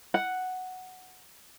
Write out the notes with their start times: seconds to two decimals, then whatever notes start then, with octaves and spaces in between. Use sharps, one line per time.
0.14 F#5